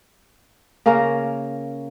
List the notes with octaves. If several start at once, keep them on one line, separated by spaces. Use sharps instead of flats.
C#3 A#3 C#4 A#4